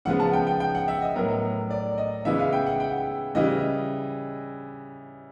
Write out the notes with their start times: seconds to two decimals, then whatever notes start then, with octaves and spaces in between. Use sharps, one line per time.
0.05 C#3 F3 G#3 B3 F#5
0.20 A5
0.33 G5
0.47 G5
0.60 G5
0.75 F#5
0.88 E5
1.02 D#5
1.16 A2 F#3 B3 A#4
1.70 D5
1.98 D#5
2.25 C#3 E3 G#3 B3 E5
2.39 F5
2.53 G5
2.66 F#5
2.80 G5
3.35 C#3 E3 G3 D#5